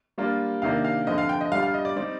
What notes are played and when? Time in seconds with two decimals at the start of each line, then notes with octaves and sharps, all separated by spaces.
0.18 G3 A#3 D4 F4
0.62 C3 D#3 A#3 D4 F5
0.85 F5
1.07 D3 F3 C4 F4 D#5
1.18 F5
1.29 G5
1.41 D#5
1.52 G3 D4 F4 F5
1.63 F5
1.74 D#5
1.85 D5
1.96 G3 C4 D#4 D5